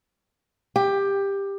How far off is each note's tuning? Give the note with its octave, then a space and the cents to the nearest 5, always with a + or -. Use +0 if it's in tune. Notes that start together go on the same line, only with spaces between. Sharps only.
G4 +15